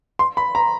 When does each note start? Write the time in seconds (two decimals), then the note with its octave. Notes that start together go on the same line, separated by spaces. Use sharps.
0.19 C6
0.37 B5
0.55 A#5